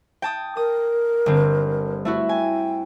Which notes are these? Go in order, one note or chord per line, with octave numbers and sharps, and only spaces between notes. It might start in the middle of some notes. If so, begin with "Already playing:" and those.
G5 A5 D#6
A#4 D#6
G1 D3 C4
A3 E4 F#4
G5 G#5